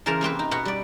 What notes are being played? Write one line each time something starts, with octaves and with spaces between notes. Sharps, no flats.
C#3 E3 A#4 C5 A5 A#5
C3 A#3 C4 B4
D#4
B2 B3 F#4 F#5
G3 D5